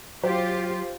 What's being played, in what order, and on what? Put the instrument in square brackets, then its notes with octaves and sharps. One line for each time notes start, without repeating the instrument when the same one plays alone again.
[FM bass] F#3 [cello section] F4 G4 [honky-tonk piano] C5